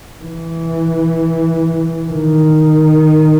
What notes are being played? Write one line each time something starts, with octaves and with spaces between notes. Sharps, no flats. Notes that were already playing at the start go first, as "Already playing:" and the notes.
E3
D#3